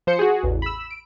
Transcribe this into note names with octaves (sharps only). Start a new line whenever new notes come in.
F3 C5 G6 C#7
F#4 G#4
A1 E2
B5 E6
D7